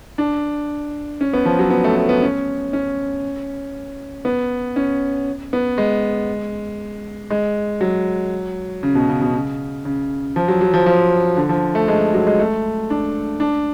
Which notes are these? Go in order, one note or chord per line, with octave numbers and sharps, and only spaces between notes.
D4
C#4
B3
F3
F#3
B3
A3
A3
B3
C#4
C#4
B3
C#4
B3
G#3
G#3
F#3
C#3
B2
C#3
B2
C#3
C#3
F3
F#3
F#3
F3
F3
D3
F3
A3
G#3
F#3
G#3
A3
D4
D4